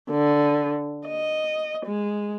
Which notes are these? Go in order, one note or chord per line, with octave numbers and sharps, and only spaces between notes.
D3
D#5
G#3